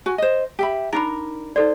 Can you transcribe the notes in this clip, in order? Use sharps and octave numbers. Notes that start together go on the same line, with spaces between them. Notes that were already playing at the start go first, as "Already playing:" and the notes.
F#4 G#5
C5 D#5
G4 E5 B5
D4 D#4 A#4 B5
D#4 A4 C5 D5